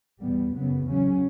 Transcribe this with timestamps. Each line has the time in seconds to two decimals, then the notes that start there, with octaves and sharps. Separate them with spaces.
0.20 E2 B2 G3 B3
0.53 F#2 C#3 F#3 B3
0.85 E2 C#3 F#3 C#4